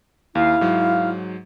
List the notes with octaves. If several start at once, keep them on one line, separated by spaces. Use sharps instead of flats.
D#2 E4 F5
G#2 F#3